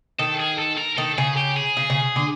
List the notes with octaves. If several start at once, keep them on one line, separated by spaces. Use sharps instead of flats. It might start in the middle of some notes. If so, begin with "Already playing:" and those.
D#3 A4
G#4
A4
A#4
D#3 A4
C#3 G#4
G4
G#4
C#3
C#3
D3